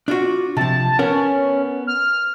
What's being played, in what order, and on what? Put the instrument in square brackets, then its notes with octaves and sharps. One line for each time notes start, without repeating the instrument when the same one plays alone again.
[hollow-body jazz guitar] D4 F4 F#4
[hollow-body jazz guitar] C3 F3 [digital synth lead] A5
[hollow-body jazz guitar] B3 A#4 F#5 [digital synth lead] C#4
[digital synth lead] F6